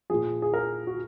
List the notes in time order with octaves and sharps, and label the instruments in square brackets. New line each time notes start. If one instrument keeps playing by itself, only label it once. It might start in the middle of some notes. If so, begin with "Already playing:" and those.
[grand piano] A#2 F3 G#4
G#4
A#4
F#4